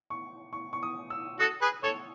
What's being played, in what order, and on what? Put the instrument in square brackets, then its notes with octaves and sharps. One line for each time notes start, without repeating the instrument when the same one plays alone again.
[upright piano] C#6
C#6
C#6
D#6
E6
[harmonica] F#4 A4 [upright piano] D#6
[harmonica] G#4 B4
[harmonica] A4 C#5 [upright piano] C#6